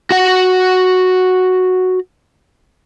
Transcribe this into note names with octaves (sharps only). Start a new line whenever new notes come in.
F#4 F#5